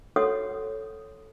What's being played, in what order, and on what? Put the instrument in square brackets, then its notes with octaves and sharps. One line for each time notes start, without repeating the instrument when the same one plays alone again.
[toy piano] F#4 A4 C#5 F#5 D#6